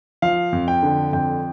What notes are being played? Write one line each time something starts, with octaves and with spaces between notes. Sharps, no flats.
F3 F5
F2
G5
D3
F2 G5